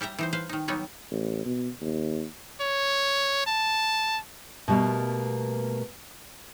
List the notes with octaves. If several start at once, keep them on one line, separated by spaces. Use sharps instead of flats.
G3 G4 E5 A#5
E3 D#4 C5
B4 C5 F5
D#3 D#4
F#3 G3 B3 D#4 C#5
A1
B2
D#2
C#5
A5
B2 G3 A3 A#3